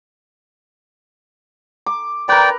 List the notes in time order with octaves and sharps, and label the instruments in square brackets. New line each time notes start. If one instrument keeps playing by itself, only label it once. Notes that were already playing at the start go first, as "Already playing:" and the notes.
[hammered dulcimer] D6
[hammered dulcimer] A#4 B4 [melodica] D5 G5